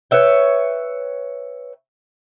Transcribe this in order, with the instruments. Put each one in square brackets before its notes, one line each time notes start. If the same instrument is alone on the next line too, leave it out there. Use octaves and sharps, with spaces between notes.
[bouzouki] B4 C#5 E5 G5